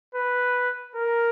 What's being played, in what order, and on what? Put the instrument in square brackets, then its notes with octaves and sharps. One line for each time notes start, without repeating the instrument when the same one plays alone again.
[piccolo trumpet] B4
A#4